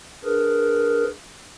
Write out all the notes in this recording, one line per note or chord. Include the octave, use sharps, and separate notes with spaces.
D4 G#4 A#4 B4